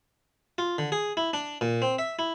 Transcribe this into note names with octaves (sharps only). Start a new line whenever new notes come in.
F4
D3
G#4
E4
D4
A#2
C4
E5
E4